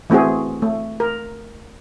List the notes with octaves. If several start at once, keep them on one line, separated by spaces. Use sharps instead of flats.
E3 A3 C4 F#4 G#4
A3
A#4